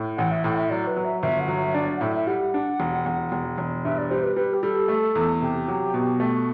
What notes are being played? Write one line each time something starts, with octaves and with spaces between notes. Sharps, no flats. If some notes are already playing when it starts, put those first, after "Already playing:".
Already playing: A2
A1 F#5
E5
A2
F#5
E5
F#3 D5
B4
F#3
E5
G1 E5
F#5
F#3
E5
D4 D5
F#5
A2 E5
E5
G3 F#5
D4
E1
E1
E1
E1
G2 E5
D5
G3 C5
B4
G3 B4
G4
G3 A4
A3
E2
C3 G4
F#3
B2
A3